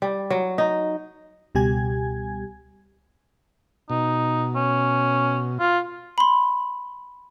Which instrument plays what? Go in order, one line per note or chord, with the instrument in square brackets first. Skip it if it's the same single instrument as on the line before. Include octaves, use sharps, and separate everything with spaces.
[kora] G3
F#3
D#4
[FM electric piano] C#2 B2 G3 G4 G#5 G#6
[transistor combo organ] B2 [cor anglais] D#4
[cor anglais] C#4
F4
[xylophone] B5 C6